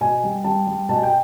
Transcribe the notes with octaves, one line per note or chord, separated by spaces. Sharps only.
B2 G#5
G3
G3 A5
G3
B2 A5
G#5
G5